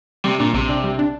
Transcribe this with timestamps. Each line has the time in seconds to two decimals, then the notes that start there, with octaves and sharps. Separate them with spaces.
0.24 C3 G3
0.39 A#2 D4
0.54 A#1 C3
0.69 D4
0.84 G3
0.99 D4